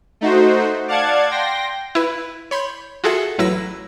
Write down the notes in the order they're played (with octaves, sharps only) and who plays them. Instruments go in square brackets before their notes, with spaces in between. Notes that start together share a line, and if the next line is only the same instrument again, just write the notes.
[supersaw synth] A3 D#4 F#4 C5
D5 F5 F#5 A5 D6 G#6
G5 C6 A#6
[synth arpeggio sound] E4 B4
C#5 B5 C6 G6
F4 F#4 G#4 A4 E5 F#5
A1 F#3 E4 B4 E6 A#6